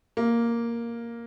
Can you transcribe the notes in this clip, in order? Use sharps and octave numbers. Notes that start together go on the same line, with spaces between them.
A#3